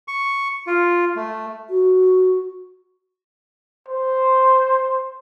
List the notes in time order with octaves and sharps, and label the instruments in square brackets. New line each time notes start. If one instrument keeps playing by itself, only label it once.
[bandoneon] C#6
F4
A3
[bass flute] F#4
[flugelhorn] C5